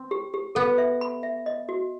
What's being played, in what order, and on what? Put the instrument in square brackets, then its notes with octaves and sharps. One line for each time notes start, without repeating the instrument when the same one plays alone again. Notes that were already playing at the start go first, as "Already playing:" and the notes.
Already playing: [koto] C4
[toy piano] G4
G4
[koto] B3 [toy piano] A4
[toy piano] E5
B5
E5
D#5
F#4